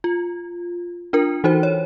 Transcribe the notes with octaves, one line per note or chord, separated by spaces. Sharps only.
F4
D4 F4 A#4
E3 D#4 F#4 C5
C#5